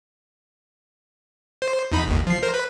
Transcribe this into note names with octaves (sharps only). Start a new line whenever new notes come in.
C5
E2 D#4 B5
G1 D#2
F3 C7
A#4 C5
B4